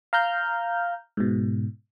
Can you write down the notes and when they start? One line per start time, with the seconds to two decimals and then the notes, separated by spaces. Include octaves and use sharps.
0.13 F5 A#5 F6 G6
1.17 G#2 B2